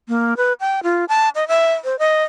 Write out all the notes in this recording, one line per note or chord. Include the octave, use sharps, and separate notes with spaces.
A#3
B4
G5
F4
A5
D#5
E5
C5
D#5